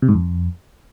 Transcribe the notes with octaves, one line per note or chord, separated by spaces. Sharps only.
C3
G#2
F2